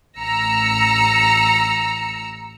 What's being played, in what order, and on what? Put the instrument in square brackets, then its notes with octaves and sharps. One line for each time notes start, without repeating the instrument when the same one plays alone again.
[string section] A1 A#5 E6 C#7